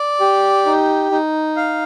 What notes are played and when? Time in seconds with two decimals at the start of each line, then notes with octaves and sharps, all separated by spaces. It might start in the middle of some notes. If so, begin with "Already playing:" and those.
Already playing: D5
0.20 G4
0.66 D#4
1.11 D#4
1.56 F5